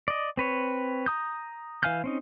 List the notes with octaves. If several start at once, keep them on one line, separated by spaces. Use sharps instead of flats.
D5 D#5
C4 B4 C#5
A#5 D#6 G6
E3 F5 G#5 F6 G6
C4 C#4 D#4